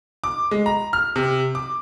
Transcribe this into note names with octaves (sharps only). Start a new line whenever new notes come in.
D6
G#3
A#5
F6
C3
D6